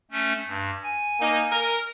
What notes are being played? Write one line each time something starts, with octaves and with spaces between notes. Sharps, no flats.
A3 C#4
G2
G#5
A#3 D#4
A#4